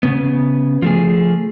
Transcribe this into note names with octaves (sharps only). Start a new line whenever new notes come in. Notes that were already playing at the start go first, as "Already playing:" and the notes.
C#3 B3
F3 A3 G#4